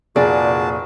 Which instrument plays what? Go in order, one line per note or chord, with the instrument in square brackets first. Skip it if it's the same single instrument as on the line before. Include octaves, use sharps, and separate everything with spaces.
[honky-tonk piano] F1 G#4 [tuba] A#2 [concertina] F#4 A5 [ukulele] D5